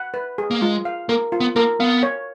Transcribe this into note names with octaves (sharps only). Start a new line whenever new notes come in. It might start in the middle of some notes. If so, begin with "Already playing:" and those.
Already playing: F#5
B4
G#4
A#3
G#3 F4
F5
A#3 A#4
F4
B3
A#3 A#4
B3 F5
C#5